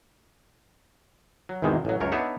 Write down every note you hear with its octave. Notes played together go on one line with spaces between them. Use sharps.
F#3
G#1 E2 C3 D#3 G#3
A1 F#3
C#2 F#2 A#4 C#5
B3 D4 D#4 C#5 E5 F#5